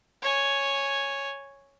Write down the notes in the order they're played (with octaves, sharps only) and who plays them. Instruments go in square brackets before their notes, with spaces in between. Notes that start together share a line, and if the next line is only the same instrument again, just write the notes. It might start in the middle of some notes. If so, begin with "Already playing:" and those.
[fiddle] C#5 G#5